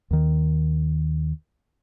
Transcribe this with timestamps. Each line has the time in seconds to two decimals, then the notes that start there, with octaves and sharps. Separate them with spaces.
0.11 D#2 D#3